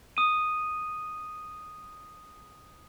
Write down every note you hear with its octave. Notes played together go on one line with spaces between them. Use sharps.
D#6 D#7